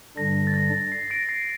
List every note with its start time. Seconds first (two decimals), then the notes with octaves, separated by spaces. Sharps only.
0.17 G2 D3 G3 D4 A#6
0.47 A6
0.54 A#6
0.92 C7
1.10 A#6 D7
1.29 C7